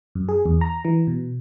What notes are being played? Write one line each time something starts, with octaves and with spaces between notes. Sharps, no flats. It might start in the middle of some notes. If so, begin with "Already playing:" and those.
F#2
G#4
E2
A#5
E3
B2